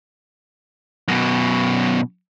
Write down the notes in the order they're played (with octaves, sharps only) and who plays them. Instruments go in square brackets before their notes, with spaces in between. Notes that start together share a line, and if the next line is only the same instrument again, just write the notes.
[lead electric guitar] F#2 B2